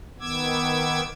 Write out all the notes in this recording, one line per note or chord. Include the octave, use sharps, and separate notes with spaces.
D#3 B3 D6 E6 G#6